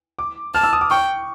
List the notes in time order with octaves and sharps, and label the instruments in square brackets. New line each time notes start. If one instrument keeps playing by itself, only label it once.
[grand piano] D6
[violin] A5 [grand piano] F6
[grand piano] E6
D#6
D6
[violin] G5 [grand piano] C#6